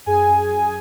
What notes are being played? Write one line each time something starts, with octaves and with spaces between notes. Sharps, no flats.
F#2 G#4 G#5
F#2
F#2